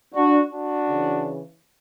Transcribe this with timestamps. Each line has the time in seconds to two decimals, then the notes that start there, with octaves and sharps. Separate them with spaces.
0.15 D4 F#4
0.52 D4 F#4
0.90 C#3 E3